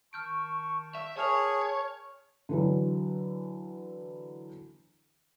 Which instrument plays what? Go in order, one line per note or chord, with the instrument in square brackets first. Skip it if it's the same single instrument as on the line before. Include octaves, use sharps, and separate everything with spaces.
[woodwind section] D#3 A5 C#6 [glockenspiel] F6 G6 D7
[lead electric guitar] E5
[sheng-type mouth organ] G#4 [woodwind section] A#4 E5 G#5 [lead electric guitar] C#5 [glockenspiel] A5 F6 F7
[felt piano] D3 E3 F#3